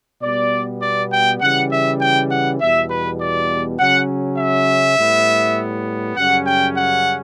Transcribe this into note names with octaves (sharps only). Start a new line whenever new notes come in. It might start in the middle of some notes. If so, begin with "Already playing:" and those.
B2 G3 B3 D5
D5
G5
C#3 E3 G3 F#5
E5
G5
F#5
E2 B2 G3 E5
B4
D5
C#3 F#3 C#4 F#5
E5
A2 G3 B3
F#2 C#3 G3 C#4 F#5
G5
F#5